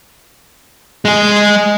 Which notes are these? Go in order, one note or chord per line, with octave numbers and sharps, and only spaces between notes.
G#3 G#4